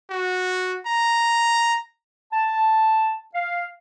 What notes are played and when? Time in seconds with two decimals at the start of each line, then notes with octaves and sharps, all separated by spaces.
0.10 F#4
0.86 A#5
2.32 A5
3.34 F5